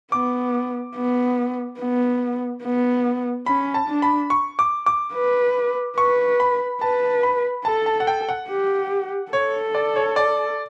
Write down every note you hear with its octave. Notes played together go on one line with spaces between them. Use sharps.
B3 D6
B3
B3
B3
C#4 B5
A5
D4
B5
C#6
D6
D6
B4
B4 C#6
B5
B4 A5
B5
A4 A5
A5
F#5
G5
F#5
G4
A4 C#5
D5
C#5
D5